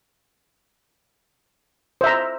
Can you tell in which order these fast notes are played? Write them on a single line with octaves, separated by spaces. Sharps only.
C5 E5 A#5